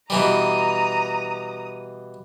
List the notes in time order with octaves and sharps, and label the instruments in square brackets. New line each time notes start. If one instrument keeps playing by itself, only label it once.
[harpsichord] B2 E3 G3 [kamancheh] A#5 D#6